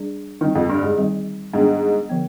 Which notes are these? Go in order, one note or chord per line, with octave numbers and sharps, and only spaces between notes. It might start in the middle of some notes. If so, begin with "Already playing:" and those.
Already playing: G3 D4 G#4 D5
D3 D#3 G3 C4
F2
G2
G#2
D#3 G3 C4 D#4 G#4
G#2 D#3 G3 B3 D4 G#4
D3 F3 B3